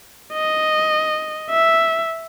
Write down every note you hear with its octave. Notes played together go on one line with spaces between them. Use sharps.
D#5
E5